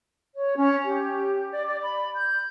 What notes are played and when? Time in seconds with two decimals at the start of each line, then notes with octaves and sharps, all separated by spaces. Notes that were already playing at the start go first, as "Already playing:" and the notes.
0.35 C#5
0.56 C#4
0.84 G4
1.52 D5
1.66 D5
1.81 B5
2.15 G6